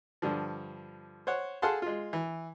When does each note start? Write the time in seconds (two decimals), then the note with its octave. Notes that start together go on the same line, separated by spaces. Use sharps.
0.22 G2 D3 F3
1.27 C5 C#5 F#5
1.62 G#4 A4 F5 F#5 A5 C6
1.82 G#3 F4
2.13 E3